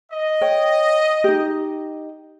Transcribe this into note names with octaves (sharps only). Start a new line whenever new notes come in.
D#5
C#5 G5
D#4 G4